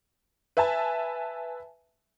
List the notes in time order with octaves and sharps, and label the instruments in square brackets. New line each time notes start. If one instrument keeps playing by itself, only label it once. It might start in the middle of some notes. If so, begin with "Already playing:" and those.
[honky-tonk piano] B4 E5 G#5 A5